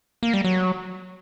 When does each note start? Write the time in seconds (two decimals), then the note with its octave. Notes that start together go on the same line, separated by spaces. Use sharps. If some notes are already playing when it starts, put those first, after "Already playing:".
0.23 A#3
0.34 G3
0.45 F#3